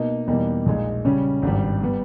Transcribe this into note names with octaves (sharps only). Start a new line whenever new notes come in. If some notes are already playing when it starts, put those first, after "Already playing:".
Already playing: B2 A#3 D#4
E2 B2 G3 A#3 D#4
A#1 A#2 G#3 D#4
C#3 G3 C#4
G#1 G2 G3
G3 B3